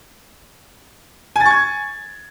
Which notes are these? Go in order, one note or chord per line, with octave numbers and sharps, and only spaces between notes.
G#5 C#6 G#6 A6